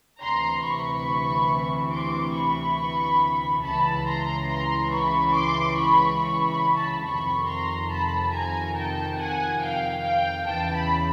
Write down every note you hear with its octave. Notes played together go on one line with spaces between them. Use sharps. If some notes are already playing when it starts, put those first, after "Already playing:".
D2 C3 E3 A#5 C6
B5 C#6
C6 D6
B5 C#6
C#2 C#3 E3 A5 B5
A#5 C6
A#5 C6
B5 C#6
C6 D6
B5 C#6
B5 C#6
B5 C#6
A5 B5
F2 C3 D#3 B5 C#6
A#5 C6
A5 B5
G#5 A#5
G5 A5
F#5 G#5
F5 G5
F5 G5
E2 C#3 E3 G5 A5
A5 B5